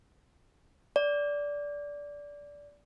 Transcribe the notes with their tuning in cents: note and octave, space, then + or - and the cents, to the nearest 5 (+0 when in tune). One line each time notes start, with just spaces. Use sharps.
D5 -15